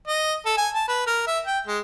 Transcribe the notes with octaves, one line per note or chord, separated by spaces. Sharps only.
D#5
A4
G#5
A5
B4
A#4
E5
G5
G#3